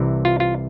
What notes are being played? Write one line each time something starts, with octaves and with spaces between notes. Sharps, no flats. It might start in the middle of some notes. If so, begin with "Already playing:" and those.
Already playing: C2 C3 E3
F4
F4